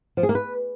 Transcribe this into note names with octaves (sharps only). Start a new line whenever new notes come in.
F3
G#4
A#3
B4